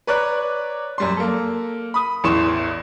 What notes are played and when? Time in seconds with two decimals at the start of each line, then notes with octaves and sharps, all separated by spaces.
0.07 B4 C#5 D5 A#5 D6 F#6
0.98 F#2 G3 C6
1.17 A#3 A4
1.94 B5 D#6
2.24 A1 E2 E3 C6 C#6 E7